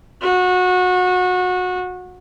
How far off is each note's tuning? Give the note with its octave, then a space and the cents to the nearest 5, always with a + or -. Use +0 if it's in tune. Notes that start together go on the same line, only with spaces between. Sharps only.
F#4 -25